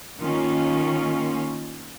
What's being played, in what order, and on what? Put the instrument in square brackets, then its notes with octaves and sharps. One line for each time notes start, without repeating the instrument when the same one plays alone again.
[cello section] D#3 A#3 C#4 F4